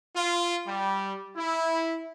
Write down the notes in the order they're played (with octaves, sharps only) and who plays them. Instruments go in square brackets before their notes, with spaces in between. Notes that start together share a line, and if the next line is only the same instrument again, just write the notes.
[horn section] F4
G3
E4